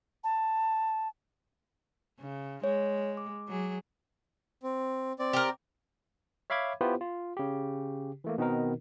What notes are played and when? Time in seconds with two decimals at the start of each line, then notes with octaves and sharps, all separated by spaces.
0.24 A5
2.20 C#3
2.64 G#3 C#5
3.17 D6
3.48 F#3 G#4
4.63 C4
5.19 C4 D5
5.33 G4 A#4
6.50 C#5 E5 F5 B5 D6 G#6
6.81 B3 E4 F4 G4 B4 C5
7.01 F4
7.37 C#3 G4
8.24 E3 A3 A#3
8.38 B2 D#3 B3 C4 D#4 A#4